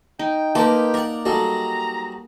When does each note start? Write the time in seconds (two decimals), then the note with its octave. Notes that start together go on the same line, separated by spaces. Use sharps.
0.19 D#4 G5
0.55 A#3 D#4 G4 A#4 B4 A5 C6
0.94 A#4 D5 F#5
1.25 F#3 G3 F#4 G#4 A4 A#5